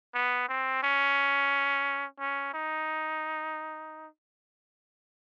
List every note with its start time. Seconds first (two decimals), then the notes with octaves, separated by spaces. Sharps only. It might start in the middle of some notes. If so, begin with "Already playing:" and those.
0.14 B3
0.49 C4
0.83 C#4
2.19 C#4
2.54 D#4